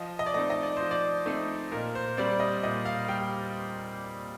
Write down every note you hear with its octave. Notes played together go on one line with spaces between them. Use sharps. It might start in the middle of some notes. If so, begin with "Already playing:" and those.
Already playing: F3 D#5
D#5
D5
A3 C4 D#4 D#5
D#5
D5
F3 C5
D5
A3 C4 D#4
A#2 A#4
C5
G3 C4 D5
D#5
A#2 D#5
F5
G3 G5